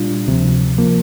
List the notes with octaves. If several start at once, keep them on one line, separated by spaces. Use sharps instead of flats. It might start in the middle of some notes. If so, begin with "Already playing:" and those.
Already playing: A#2 G3 D4 F4
D2 C3 F3
F3 A#3